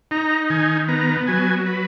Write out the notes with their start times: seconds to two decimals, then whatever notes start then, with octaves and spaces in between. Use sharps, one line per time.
0.11 D#4 A#5
0.50 D#3 G#5
0.88 B3 A#5
1.27 F#3 G#5
1.66 B4